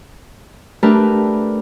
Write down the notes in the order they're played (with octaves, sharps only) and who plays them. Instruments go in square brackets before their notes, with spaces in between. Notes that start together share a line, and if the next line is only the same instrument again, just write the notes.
[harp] A3 D4 G4 A#4 B4